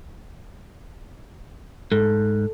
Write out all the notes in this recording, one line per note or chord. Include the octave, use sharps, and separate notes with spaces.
G#2 A4